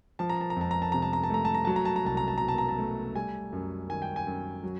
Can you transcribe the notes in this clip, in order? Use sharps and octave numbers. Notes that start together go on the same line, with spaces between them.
F3 A5
A#5
A5
A#5
F2 A5
A#5
A5
C3 A#5
A5
A#5
A5
A3 A#5
A5
A#5
F#3 A5
A#5
A5
A#5
C2 A5
A#5
A5
B2 A#5
A5
A#5
A5
A3
G3 G#5
F#2
D#3 G#5
G5
G#5
F#2
F#3